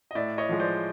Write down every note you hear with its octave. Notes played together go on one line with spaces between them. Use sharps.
D#5
A2 D5 E5
C#5 D#5
F3 G#3
C5 D5